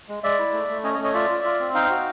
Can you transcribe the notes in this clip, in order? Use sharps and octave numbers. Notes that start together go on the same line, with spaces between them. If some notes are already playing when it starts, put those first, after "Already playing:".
G#3
G#3 D5 E5
E4
A3
A3
C#4 C#5 D#5
C#5 D#5
A3
C#5 D#5
F4 D5 E5
F4
F4
C4
D#4 F5 G5
F#4